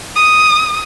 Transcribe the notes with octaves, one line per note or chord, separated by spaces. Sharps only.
D#6